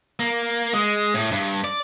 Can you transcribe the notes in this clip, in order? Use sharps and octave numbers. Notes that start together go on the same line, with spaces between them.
A#3
G#3
A2
G2
D5